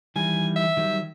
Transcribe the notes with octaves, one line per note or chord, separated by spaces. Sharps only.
D#3 E3 G3 G#5
E5
D#3 F#3 G3